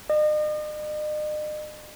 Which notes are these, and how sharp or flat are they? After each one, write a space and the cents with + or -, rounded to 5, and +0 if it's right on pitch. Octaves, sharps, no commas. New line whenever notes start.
D#5 -45